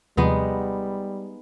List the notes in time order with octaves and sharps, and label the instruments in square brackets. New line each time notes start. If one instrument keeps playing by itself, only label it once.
[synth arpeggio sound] D#2 C3 F3 [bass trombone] G3 [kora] G#3 B3 D#4